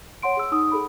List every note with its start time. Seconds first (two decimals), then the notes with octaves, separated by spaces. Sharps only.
0.23 C#5 F#5 C6 D7
0.37 G#4 E6
0.52 D#4 D#6
0.72 G#4 A4 B5